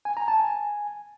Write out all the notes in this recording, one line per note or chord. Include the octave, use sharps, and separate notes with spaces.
G#5
A#5
A5
G#5